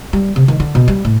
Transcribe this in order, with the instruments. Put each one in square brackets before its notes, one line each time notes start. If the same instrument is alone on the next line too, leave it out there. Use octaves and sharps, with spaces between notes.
[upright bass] G3
C3
D#3
D3
B2
G3
A2